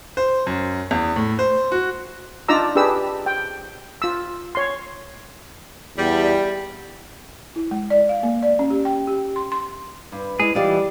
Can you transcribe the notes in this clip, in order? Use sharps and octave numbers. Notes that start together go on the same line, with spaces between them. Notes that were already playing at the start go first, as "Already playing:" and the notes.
C5
F#2
E2
A2
C5
F#4
D4 D#4 F4 D5 A#5 E6
D4 G4 G#4 B4 E6
G5
F4 E6
C#5 C6
E2 G3
E4
G#3
D5
F5
A#3
D5
C#4
G4
G5
G4
C6
C6
G2 B4
G#3 E4 G#4 D5
E3 G3 F4 G4 D5 D#5